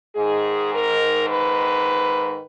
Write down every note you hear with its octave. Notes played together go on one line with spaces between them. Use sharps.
G#2 D#3 G#4
A#4
B4